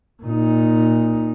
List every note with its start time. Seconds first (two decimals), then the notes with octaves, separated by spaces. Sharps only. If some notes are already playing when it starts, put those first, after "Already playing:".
0.23 A#2 D#4